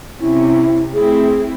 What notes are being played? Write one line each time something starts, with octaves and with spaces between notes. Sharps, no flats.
C3 C#4 E4
A3 C4 E4 G#4